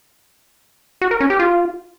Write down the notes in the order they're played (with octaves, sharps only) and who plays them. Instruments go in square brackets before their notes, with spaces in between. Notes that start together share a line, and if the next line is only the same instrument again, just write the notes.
[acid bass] F#4
A#4
C#4
G4
F4